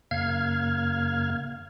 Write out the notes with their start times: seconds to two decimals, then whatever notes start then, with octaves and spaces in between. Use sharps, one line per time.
0.11 F#2 C#3 A#3 F5 F6 G#6